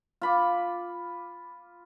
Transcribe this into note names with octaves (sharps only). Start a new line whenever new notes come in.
F4 B5 D6